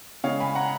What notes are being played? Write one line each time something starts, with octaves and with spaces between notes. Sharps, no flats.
C#3 G#3 C#5 F5
G#5 B5
F#5 A#5